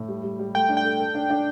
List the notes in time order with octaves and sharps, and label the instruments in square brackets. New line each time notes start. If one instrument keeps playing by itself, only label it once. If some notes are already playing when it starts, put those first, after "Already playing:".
Already playing: [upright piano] A2
G3
G3
G3
[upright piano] A3 [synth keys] G5
[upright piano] D4
[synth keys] G5
[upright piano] A4
A4
D4
D4